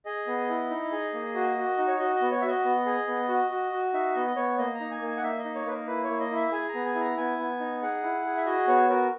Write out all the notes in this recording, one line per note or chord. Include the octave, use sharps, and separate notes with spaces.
G#4 D#5
B3
E4
D#4
G#4
A#3
F#4
F#4
D#4
C#5
F#4 D#5
D#5
B3
C#5
F#4 E5
D#5
B3
G#4
B3
F#4
F#4
F#4
D#4 E5
B3 D#5
D#5
B3 C#5
A#3 D#5
A#5
D#4
G#5
A#3
G#5
F#5
A#3 E5
D#5
D#4
C#5
A#3 A#4 B4
E4 B4
C#5
A#3
D#5
E4
E5
G#4 G#5
A#5
B3
G#5
E4
A#5
B3 G#5
B3
D#4
G#4 F#5
E4
G#4
E5
F#4 D#5
B3 C#5
F#4 A#4